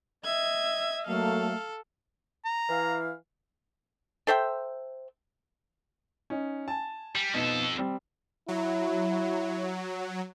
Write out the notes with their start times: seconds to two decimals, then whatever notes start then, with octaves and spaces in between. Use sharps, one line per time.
0.25 D#5 E5 G#6
1.07 F#3 A3 A#3 A4 F5
2.45 A#5
2.69 E3 F5
4.27 A4 C5 E5 G5
6.30 C#4 D#4
6.68 G#5 A5
7.16 G3
7.34 F2 B2 D#4 A4
7.78 G3 C4
8.48 F#3 E4